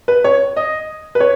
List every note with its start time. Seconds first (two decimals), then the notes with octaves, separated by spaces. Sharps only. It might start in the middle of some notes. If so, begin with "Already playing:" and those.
0.08 B4
0.24 C#5
0.57 D#5
1.15 B4
1.20 C#5